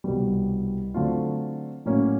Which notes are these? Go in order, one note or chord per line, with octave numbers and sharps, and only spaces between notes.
C2 B2 G3
D3 F#3 A3 C4 F4
A2 F#3 A#3 C#4